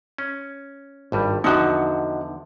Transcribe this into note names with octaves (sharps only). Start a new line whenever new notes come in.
C#4
G#1 G2 G3
E2 D3 F3 D#4 F#4